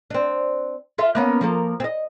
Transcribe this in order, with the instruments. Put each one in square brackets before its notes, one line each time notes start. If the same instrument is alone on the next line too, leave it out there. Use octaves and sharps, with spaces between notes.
[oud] C4 D4
F4 A4 E5
A#3 B3 C#4
F3 A#3 A4
C4 D#5